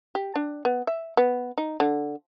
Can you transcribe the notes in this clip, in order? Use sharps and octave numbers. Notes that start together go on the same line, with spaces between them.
G4
D4
B3
E5
B3
D#4
D3